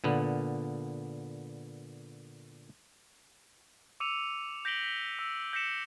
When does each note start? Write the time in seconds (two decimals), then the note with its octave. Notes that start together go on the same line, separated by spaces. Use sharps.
0.04 A#2 D3 B3
4.00 D6 E6 C#7 D#7 F7
4.65 G6 A#6 B6 D7 F#7 G7
4.84 B6 G7
5.19 E6
5.53 G6 A#6 B6 C#7 E7